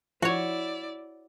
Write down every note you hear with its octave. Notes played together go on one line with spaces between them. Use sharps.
F3 E4 F#4 C#5 D5